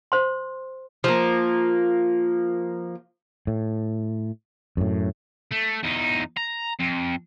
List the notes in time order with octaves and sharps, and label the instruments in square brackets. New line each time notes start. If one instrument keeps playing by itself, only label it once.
[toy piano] C5 C6
[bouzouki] F3 A#3
[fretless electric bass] A2
F#2 A2
[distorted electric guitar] A3
E2 D#4
A#5
F2